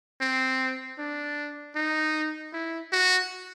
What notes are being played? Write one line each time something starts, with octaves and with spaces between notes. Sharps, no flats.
C4
D4
D#4
E4
F#4